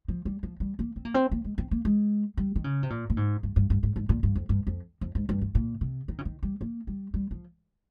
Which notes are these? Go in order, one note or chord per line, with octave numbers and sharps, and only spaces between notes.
F3
G3
F3
G3
A#3
C4
A#3
C4
A#3
G#3
C4
A#3
G#3
G3
D#3
C#3
C3
A#2
A#2
G#2
G2
G2
G2
G#2
G#2
A#2
G2
F2
G2
F2
F2
G#2
G2
G2
A#2
C3
D#3
C#3
D#3
G3
A#3
G3
G3
F3